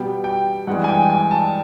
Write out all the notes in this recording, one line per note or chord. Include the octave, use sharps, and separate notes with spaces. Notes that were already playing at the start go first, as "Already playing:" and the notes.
Already playing: B2 G3 B3 G5
G5
G2 E3 G#3 B3 F#5
G#5
G5
G#5
A5